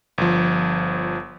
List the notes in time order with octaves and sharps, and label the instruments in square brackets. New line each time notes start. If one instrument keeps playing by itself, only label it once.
[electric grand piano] G1 F3